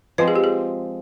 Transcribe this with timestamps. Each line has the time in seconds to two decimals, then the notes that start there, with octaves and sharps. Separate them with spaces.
0.18 F3 G#3 C4 B4
0.28 G#4
0.36 G4
0.44 G#4